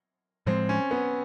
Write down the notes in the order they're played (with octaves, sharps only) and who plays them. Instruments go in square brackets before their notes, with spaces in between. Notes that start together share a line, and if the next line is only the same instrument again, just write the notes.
[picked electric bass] A2 F3 G#3 [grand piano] C4
[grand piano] C#4
B3